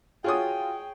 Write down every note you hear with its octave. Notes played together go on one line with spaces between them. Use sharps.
F4 F#4 G#4 C#5 G5 D#6